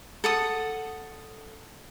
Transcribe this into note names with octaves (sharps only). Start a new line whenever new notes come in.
A4 F#5 D#6